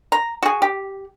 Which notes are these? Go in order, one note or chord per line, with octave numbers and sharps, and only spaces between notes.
A#5
F#4 G#4
G4